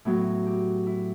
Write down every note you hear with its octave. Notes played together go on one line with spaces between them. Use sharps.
A2 F#3 B3
G4
E4